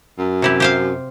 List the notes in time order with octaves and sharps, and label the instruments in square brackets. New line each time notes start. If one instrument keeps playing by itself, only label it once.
[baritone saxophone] F#2
[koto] C3 E4 G4
G4 C5 F5